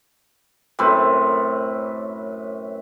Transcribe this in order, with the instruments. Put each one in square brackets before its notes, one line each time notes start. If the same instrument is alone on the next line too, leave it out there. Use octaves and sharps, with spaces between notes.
[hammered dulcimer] F#2 A2 C4 B4